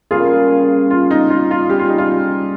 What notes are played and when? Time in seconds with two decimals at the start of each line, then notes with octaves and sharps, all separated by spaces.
0.11 C#3 G3 A#3 F4 G#4
0.90 F4
1.11 D#4
1.30 F4
1.51 F4
1.69 G3 C#4 G4 G#4
1.79 F4
1.89 D#4
1.98 F4